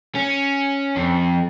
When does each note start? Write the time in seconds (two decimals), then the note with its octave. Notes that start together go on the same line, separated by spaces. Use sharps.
0.15 C#4
0.96 F2